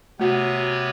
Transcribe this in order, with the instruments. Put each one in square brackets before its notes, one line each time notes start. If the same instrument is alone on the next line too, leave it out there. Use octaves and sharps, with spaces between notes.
[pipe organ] C3 B3 C#5 [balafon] A3 F#4 F#5